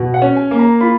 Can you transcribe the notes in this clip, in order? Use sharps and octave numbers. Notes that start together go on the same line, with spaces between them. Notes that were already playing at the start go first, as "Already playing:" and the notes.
Already playing: B2
F#5
C#4
G#5
A#3
A#5
F4 B5